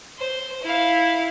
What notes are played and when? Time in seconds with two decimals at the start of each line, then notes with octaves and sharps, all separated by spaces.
0.18 C5
0.63 E4 F5